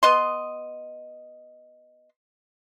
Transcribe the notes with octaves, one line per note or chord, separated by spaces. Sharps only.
B3 D#5 C6